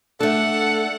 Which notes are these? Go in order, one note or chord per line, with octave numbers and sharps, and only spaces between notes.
A3 D4 A4 F#5